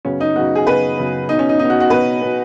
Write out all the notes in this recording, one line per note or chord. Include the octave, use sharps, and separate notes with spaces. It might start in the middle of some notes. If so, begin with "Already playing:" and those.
F#2 C#3 B3 C#4
D#4
F#2 C#3 B3 F#4
G#4
F#2 C#3 B3 B4
F#2 C#3 B3
B2 B3 D#4
C#4
D#4
B2 B3 D#4
F#4
F#4
B2 B3 B4
B2 B3